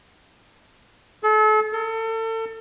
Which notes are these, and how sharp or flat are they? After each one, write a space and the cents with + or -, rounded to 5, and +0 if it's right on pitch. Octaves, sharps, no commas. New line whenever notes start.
A4 -35
A4 +35